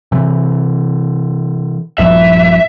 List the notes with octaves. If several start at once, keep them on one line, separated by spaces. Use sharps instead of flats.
C3 E3
A#1 G2 F3 E5